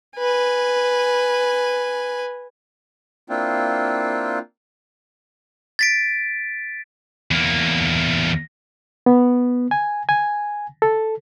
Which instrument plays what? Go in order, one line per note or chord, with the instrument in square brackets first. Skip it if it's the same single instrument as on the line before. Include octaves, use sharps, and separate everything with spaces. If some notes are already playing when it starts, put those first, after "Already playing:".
[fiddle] B4 G#5
[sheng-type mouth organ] A#3 C4 D4 E4 F4 G5
[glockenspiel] A6 B6 D7
[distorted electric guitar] E2 A#3
[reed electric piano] B3
G#5
G#5
A4